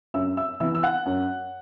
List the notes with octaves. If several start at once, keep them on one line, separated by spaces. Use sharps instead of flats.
F#2 E5 E6
E5 E6
E3 B3 E5 E6
E6
F#5 F#6
F#2